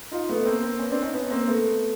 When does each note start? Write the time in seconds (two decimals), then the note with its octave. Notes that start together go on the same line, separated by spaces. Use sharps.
0.11 D#4 F4
0.29 A3 B3
0.46 A#3 C4
0.62 A#3 C4
0.79 B3 C#4
0.90 C4 D4
1.02 C#4 D#4
1.13 B3 C#4
1.30 A#3 C4
1.47 A3 B3